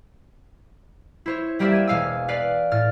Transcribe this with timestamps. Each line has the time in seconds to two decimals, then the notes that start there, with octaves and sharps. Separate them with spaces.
1.26 E4 C5 C#5
1.59 G3 A#3 G4 C5 D5 E5
1.72 G#6 D#7 E7
1.87 E1 F5 G#5 E6
2.28 B4 D5 F5
2.71 A2 F6 A6